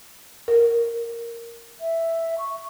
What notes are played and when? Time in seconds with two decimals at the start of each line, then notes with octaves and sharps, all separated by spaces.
0.48 A#4
1.80 E5
2.38 C#6